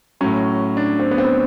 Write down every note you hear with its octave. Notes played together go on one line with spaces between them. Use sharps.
A2 F#3 C#4
D4
C4
B3
C4
B3